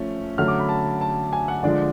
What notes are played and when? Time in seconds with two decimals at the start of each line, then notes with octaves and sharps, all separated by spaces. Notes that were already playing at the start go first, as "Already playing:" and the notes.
Already playing: F3 A3 C#4
0.38 D3 F#3 A3 C#4 F6
0.48 D6
0.59 B5
0.69 A5
1.01 A5
1.33 G#5
1.48 F#5
1.63 D3 F3 G#3 D4 D5